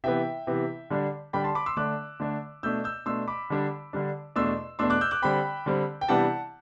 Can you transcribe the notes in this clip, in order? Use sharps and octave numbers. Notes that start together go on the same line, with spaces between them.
C3 E3 B3 E5 G5
C3 E3 B3
D3 G3 D4
D3 G3 D4 G5 B5
A5 C6
B5 D6
C6 E6
D3 A3 D4 D6 F#6
D3 A3 D4
B2 A3 D4 E6 G6
E6 G6
B2 A3 D4 C6 E6
B5 D6
D3 G3 D4
D3 G3 D4
E2 B2 A3 D4 C6 E6
E2 B2 A3 D4 C6 E6
D6 F#6
E6 G6
D6 F#6
D3 G3 C4 G5 B5
D3 G3 C4
G5
C3 E3 G3 B3 D4 F#5 A5